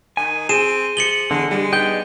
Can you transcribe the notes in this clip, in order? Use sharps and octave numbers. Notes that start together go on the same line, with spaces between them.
D#3 G#5
C4 G#4 D#7 E7
F3 C#7 F#7 G7
E2 D3 G#3
G3 G#3 D4
B3 D#4 G5 G6 G7